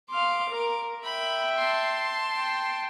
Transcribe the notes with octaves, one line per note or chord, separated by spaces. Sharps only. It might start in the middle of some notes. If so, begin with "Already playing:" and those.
F5 C6 D6
A#4
E5 G5 B5
A5 C6
G5